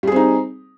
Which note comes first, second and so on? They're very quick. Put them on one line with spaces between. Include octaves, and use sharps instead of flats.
G3 G#4 C4 D#4